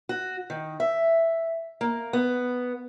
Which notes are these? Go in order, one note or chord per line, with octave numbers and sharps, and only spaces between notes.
F#4
D#3
E5
A#3
B3